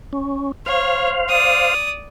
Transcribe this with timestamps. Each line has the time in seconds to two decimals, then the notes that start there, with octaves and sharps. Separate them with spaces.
0.13 C#4
0.66 C5 C#5 F5
1.29 D5 D#6